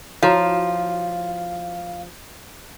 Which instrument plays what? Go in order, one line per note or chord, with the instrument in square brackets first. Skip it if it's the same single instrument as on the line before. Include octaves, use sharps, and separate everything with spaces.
[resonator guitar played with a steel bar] F3 [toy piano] E4 F#4 C#5 [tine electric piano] F5